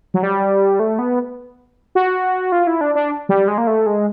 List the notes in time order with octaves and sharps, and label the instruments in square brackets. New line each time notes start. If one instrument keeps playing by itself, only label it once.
[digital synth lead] F#3
G3
A3
B3
F#4
F4
E4
D4
D4
G3
G#3
A#3
A3
G#3